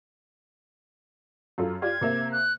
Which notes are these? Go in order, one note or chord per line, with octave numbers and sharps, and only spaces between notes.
F#2 F4 A4
F4 G4 D5 G#6
C3 A#3 E5
F#6